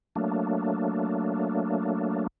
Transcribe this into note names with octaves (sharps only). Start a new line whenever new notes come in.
F#3 A3 A#3 D4